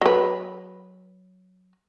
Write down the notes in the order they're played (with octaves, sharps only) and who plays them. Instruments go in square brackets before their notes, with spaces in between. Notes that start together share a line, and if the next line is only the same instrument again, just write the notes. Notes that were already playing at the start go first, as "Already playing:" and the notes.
[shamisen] F#3 B4